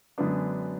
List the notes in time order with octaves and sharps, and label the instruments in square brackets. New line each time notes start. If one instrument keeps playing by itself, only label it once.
[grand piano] F#2 D3 G#3 B3 D4